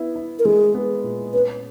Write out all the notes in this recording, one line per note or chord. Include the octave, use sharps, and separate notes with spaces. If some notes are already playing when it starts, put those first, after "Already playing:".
Already playing: B3 E4
E4
A#4
G#3 G#4
B3
A#2
C#4 B4